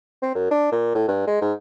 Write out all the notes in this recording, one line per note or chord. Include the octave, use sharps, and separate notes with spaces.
C4
F#2
D4
A#2
A2
G2
G#3
G#2